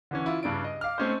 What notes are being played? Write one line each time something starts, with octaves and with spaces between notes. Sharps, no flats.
D3 E3 C#4
E4 F4
G2 C#3 D4 D7
D#5
F5 D6 F6
A3 C4 C#4 D#4 C5